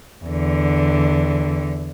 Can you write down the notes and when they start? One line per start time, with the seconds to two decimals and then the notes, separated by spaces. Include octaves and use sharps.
0.24 E2 D3